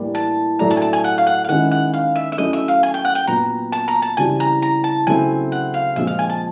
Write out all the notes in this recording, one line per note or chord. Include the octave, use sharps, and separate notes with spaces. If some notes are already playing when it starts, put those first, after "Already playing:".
Already playing: A2 E3 G3 A#3 D4
A5
A2 F#3 A3 D4 A#5
A5
G#5
A5
G#5
F#5
F5
F#5
F5
D#3 G#3 C#4 E4 F#5
F#5
F5
E5
E5
F#3 A3 C#4 E4 D#5
E5
F5
G#5
G5
F#5
G5
A#2 F#3 B3 A#5
A5
A#5
A5
C#3 E3 G3 C4 G#5
A#5
A#5
A5
C#3 F#3 A3 C4 E4 G#5
F#5
F5
A#2 F3 G#3 C4 E5
F5
G#5
A5